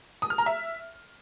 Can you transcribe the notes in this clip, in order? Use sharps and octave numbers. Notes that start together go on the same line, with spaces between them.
D#6
F6
A#5
E5